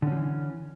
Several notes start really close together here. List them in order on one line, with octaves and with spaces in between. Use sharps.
D3 C#4 F3 E3